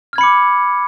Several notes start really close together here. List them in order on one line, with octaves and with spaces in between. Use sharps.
F6 G#6 B5 C#7 D6